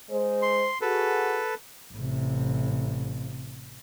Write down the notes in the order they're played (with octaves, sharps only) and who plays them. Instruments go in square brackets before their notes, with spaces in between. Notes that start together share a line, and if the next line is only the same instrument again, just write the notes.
[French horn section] G#3 C5
[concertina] C6
[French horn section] F#4 G#4 [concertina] A4 B4
[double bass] A1 C3